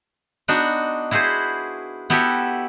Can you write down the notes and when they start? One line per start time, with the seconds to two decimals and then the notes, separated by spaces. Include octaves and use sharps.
0.48 B3 D4 D#4 F#4
1.11 E4 F#4 G#4 B4 C5
2.10 B3 E4 F#4 G4 A4 E5